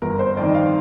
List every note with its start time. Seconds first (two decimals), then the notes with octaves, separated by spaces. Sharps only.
0.02 G1 A#4
0.19 C5
0.37 F2 D#3 D5
0.49 D#5
0.55 F5